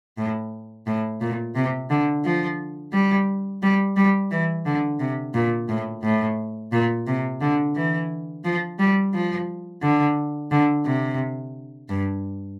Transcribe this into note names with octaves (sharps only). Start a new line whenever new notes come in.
A2
A2
A#2
C3
D3
F3
G3
G3
G3
E3
D3
C3
A#2
A2
A2
A#2
C3
D3
E3
F3
G3
F3
D3
D3
C3
G2